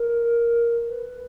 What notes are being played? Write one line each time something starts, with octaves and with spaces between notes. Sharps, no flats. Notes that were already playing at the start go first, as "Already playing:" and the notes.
Already playing: A#4
B4